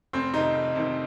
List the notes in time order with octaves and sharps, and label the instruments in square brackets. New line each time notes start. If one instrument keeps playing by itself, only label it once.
[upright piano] F1 [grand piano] C4
[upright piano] F2 C3 D#3 [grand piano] D#4
[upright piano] F1
F2 C3 D#3